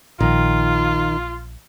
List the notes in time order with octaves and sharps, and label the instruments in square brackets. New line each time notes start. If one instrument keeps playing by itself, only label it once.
[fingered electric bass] A#1 [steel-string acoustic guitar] D#3 [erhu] F4